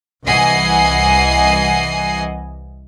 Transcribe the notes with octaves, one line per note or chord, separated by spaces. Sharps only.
C2 E3 D#5 F#5 G#5 C7